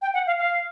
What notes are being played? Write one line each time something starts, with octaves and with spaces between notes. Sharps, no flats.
G5
F#5
F5
F5